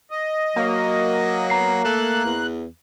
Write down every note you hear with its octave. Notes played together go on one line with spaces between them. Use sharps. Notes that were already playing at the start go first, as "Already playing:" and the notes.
D#5
F#3 A#3
B3 A#5 C7
A3 A4 F#6
E2